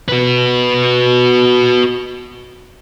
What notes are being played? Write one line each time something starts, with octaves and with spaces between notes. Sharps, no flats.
F#4 B4